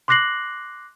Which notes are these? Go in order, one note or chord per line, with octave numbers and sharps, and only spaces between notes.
C6 D6 F#6 A#6 C7 F#7